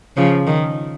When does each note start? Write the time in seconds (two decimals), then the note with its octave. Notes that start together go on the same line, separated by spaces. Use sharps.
0.17 C#3 F3
0.47 D#3